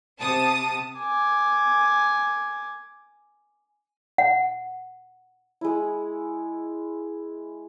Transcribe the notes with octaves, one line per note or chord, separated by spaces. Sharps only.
C3 A5 D#6
G#5 D6
F#5
G#3 E4